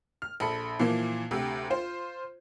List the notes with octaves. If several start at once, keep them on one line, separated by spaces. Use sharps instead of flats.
F6
A#1 A4 B5 C#7
A#2 E3 F3 A#3
D2 C3 G4 E6
F4 C5